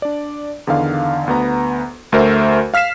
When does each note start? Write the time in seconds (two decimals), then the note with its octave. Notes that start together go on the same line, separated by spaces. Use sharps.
0.02 D4 D5
0.67 E2 D3 D#3 F5
1.27 D2 B3 A#5
2.12 D2 A3 F#4 A#4 C5 E5
2.74 F5 F6 B6 C7 E7